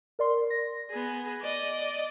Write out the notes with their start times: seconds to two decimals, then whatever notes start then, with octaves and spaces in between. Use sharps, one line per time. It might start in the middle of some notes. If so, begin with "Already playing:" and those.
0.19 A#4 D5 C6
0.50 A#6
0.91 B3 G#4
1.41 D5 D#5